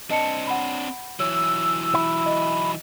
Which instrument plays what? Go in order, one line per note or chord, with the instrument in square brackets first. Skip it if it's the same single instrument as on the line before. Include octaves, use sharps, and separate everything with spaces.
[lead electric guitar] C4 D4 [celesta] D#5 A5 C#7
[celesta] F#5 B5
[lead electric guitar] E3 F#3 [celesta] C#5 [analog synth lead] E6
[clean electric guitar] E4
[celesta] D#5